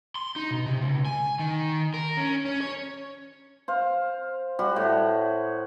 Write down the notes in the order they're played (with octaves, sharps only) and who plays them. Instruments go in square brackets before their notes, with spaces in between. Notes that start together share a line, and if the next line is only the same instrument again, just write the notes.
[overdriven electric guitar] C6
D#4
B2
C3
C#2
G#5
D#3
A#4
C#4
C#4
C#5
[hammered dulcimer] C5 F5
G3 F#4 F#5
A2